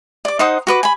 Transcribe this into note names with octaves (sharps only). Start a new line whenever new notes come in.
D5 D6
D#4 C5 F#5 D#6
F#4 B4 D6
G#5 B5